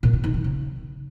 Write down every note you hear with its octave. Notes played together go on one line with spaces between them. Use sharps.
A#2
D3
D#3
D#3
C#3